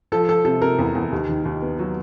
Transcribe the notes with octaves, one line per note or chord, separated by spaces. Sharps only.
F3 A4
F3 A4
C3 A4
C3 A#4
E2
E2
D#2
D#3
D#2
B3
F#3